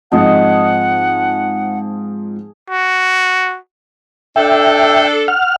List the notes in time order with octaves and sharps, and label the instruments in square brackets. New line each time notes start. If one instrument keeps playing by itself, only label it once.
[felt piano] G#2 F3 C4 [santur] G#4 D#5 A5 [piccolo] F#5
[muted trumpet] F#4
[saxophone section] D4 A4 [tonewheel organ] E5 G5
[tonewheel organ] F#5 F6